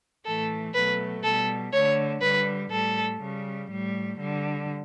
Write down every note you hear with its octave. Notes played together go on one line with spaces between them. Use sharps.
A2 E3 A3 A4
B2 F#3 A3 B4
B2 G3 A4
D3 A3 C#5
D3 G3 B4
A2 G3 A4
C#3 G3
A2 G3
D3 G3